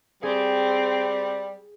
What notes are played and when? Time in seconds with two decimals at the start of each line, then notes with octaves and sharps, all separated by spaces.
0.23 G3 C4 G#4